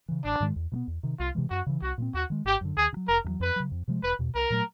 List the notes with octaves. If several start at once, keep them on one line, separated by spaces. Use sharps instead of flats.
C#3 E3
A1 D4
G#2 D#3 G#3
E2
B2 G#3 B3
E2
C3 D#3
C2 F4
C3 E3 G#3
F#2 F#4
C#3 E3
C2 F#4
A#2 G3 C4
D#2 F#4
D#3 G#3
G#1 G4
F#2 D3
D#2 G#4
C#3
F#3
F1 A#4
E2 C#3 F#3
F2 B4
C#3 F#3
F2
C3 F3 G#3
E1 B4
E2 B2
C2 A#4
A#2 F#3 A3